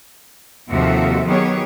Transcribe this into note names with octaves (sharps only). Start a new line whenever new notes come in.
D#2 C3 F3 F#4 A4 E5
D#3 F#3 B3 G4 G#4 C#5